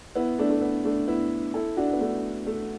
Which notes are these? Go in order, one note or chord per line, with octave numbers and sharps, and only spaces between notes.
B3 E4
A3 D4
A3
B3
A3 D4
B3 E4
E4 A4
D4 F#4
B3
A3 D4
A3